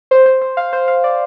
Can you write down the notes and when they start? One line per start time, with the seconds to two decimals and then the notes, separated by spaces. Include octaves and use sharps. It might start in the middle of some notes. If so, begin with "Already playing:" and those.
0.11 C5
0.26 C5
0.41 C5
0.57 F5
0.73 C5
0.88 F5
1.04 D5